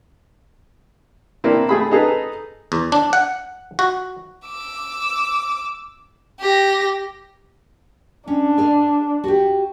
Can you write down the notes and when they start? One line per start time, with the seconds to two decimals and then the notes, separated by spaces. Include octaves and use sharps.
1.44 A#3 C4 D4 E4
1.69 A3 G#4 B5
1.91 D#4 G#4 A4 B4
2.72 E2
2.92 D4
3.13 F#5
3.79 F#4
4.46 D6 E6
6.40 G4 A#6
8.28 C#4 D4
8.58 G#4 D5 F5
9.24 F#4 G4